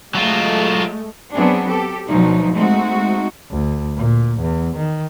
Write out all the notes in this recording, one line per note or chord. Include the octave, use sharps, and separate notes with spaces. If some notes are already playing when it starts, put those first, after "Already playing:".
F#3 G#3 A3 F4
F#3 B3 C4 D4 G#4
G4 A4
D2 B2 F3 F#3 D#4
G#3 A3 C4 D#4 F#4
D2
A#2
E2
D#3